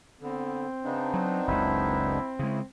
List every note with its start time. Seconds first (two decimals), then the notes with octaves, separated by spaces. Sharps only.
0.21 D3 B3 C4
0.84 C#3 B3 D4 D#4
1.14 F#3
1.48 F#1 C#2 E4
2.39 C#3 G#3 E4